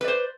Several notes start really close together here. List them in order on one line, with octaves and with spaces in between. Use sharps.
B4 D5 C5